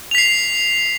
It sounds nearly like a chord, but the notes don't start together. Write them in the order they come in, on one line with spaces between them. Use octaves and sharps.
F7 B6 C7